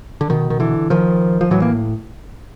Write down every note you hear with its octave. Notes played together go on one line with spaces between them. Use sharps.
D3
B2 D#3
D#3
D3 E3
D#3 F3
F3
A2 E3 F#3
A#3